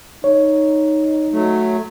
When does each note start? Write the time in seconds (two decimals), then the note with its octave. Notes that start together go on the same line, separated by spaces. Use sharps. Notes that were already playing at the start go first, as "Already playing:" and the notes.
0.24 D#4 C#5
1.33 F#3 A3